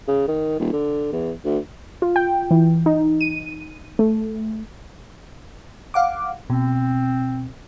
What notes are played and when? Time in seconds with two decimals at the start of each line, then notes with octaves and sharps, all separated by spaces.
0.08 C#3
0.28 D#3
0.59 D#1
0.73 D3
1.13 E2
1.45 D2
2.02 F4
2.16 G5
2.51 E3
2.86 D#4
3.21 D#7
3.99 A3
5.94 F5 F#5 D6
6.50 B2 C4